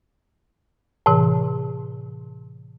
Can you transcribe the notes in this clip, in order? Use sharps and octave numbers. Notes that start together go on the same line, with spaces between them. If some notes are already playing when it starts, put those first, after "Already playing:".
A2 C3 E3